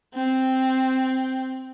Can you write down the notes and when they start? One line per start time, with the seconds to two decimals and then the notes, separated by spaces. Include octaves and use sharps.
0.14 C4